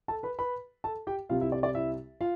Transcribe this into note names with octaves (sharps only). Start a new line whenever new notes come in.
A4 A5
B4 B5
B4 B5
A4 A5
G4 G5
C2 C3 G3 C4 F4 F5
E4 E5
D5
D5
E4 E5
F4 F5